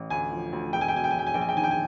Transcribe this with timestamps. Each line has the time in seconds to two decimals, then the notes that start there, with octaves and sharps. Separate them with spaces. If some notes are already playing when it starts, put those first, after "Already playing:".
Already playing: A1
0.10 D2 G#5
0.32 F3
0.52 D2
0.73 E1 G5
0.81 G#5
0.88 G5
0.93 B2 G#5
1.04 G5
1.11 G#5
1.14 E1 G5
1.27 G#5
1.34 A#1 G5
1.41 G#5
1.49 G5
1.56 D#3 G#5
1.64 G5
1.71 G#5